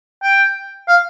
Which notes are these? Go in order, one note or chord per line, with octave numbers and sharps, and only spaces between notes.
G5
F5